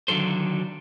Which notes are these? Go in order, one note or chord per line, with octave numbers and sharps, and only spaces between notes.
D3 D#3 F#3 A4 C5